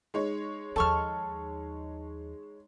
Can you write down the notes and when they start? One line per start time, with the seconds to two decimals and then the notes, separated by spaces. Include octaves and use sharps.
0.14 G#3 D#4 C#5
0.76 D#2 F3 A4 A5 C#6 F6